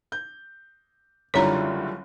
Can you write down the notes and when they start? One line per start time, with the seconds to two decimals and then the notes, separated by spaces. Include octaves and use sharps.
0.12 G6
1.34 F#1 D3 G3 E4 F4 C#5 A#5